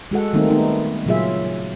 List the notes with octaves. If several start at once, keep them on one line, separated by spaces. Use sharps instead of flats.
G#3 F#4 A4 F#5
D#3 G3 A3 A#3 C4 D#4
A3 B3 D#4
A#2 C#3 F#3 F4 G#4 E5